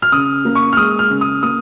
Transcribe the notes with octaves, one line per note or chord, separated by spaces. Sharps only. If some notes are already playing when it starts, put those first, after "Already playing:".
F6
C#3 D#6
A#3
C#6
F6
G#3 D#6
F6
C#3
D#6
A#3 D#6